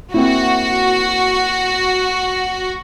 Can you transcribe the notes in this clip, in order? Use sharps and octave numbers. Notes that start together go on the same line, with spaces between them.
A#3 C4 E4 F#4